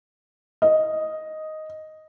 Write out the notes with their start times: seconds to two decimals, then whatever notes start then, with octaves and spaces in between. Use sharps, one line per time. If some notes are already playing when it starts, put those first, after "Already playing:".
0.62 D#5